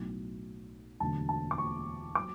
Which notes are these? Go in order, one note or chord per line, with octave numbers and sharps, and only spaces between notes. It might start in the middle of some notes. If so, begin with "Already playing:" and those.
Already playing: B1 A2 F#3
E1 D2 D3 F#3 A5
A5
D6
C#6
F#3 D6